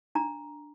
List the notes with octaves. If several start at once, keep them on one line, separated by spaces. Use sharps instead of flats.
D4 A#5